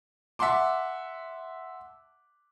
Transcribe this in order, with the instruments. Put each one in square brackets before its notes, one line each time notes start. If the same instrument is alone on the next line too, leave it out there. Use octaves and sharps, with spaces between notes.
[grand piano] E5 F#5 A5 C6 D6